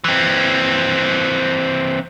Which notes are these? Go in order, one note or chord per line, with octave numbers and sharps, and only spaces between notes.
E3 C4